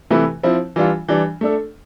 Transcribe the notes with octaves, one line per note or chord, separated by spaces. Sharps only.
C3 E3 A3 E4 B4
F3 C4 E4
E3 G3 D4 F4
E3 G3 D4
A3 D4 A4